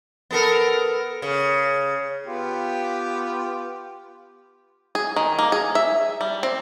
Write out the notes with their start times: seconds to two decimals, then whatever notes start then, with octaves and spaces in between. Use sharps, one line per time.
0.31 B3 A4 A#4
1.22 C#3
2.26 B3 F4 G4
4.95 G#4
5.16 D#3
5.39 A#3
5.52 G#4
5.75 E5
6.21 G3
6.43 C4